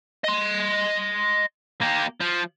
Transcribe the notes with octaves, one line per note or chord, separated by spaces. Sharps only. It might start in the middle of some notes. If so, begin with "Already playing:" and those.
D#5 C6
A#3 G4
F3